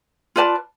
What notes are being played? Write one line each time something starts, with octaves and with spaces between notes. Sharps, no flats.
F4 B4 D5 A5